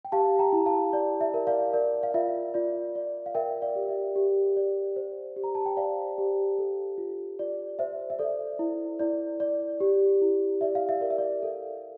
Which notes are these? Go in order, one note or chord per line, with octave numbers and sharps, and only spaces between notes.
G5
G4 F5 A5
G5 A#5
E4
F5 A5
D5
E5
A#4
D5 F5
A#4 D5
F5
F4 E5
F4 D5
D5
F5
A#4 E5 G5
D5 F5
G4
E5
G4
D5
C5
G4
A#5
A5
G5
C5 D5 F5
G4
A4
F4
F4 D5
C5 E5
E5
A4 D5
E4
E4 D5
D5
G4
E4
D5 E5
F5
E5
A#4 D5
E5
D5
A4